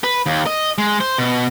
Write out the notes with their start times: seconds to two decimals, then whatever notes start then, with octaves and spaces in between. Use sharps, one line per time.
0.04 B4
0.26 D#2
0.46 D#5
0.78 G#3
1.01 C5
1.18 B2